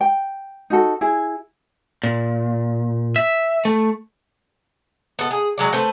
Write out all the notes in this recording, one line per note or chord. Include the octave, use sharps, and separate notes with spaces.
G5
D#4 F#4 A4
E4 G#4
A#2
E5
A3
B3 A4
G#4
F#3 G#3 D5
A3 B4 C5